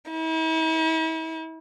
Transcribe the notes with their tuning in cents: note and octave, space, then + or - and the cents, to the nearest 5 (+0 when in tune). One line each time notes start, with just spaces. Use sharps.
E4 -45